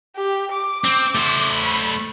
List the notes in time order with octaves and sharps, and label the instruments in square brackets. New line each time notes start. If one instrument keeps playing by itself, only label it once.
[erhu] G4
D6
[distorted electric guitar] C4
A3 C5
[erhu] B5